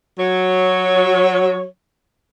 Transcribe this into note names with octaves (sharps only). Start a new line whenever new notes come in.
F#3 C#5